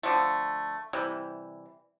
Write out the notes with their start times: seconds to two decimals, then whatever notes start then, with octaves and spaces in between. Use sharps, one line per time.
0.03 D3 F3 A3
0.93 C3 E3 G3